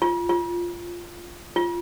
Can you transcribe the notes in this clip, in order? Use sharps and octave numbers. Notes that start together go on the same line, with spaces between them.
F4
F4
F4